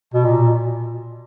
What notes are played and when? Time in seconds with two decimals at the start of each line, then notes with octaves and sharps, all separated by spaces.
0.14 B2
0.24 A#2